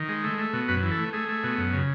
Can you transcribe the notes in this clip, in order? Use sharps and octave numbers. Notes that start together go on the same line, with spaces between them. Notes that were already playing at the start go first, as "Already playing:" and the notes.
Already playing: D#3
G#3
A3
A3
B2
F#2 B4
E3
A4
A3
A3 G#4
A3
B2
F#2
C#3